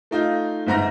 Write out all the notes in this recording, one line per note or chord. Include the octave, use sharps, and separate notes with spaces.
A3 D#4 F4
G1 G#2 A#5 A#6